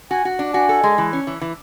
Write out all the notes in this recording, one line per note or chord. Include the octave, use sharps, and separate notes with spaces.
F#4 G#5
F#4
D4
F#4 G#5
A4
G#3
E3
C#4
E3
E3